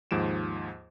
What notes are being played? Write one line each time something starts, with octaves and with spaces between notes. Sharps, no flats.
D#2 G#2 F3 D7 E7